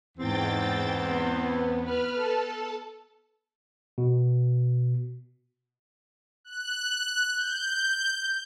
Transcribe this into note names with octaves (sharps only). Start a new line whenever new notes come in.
E2 G#2 C4 G5 A6
B3
B4 F6
A4 A5
B2
F#6
G6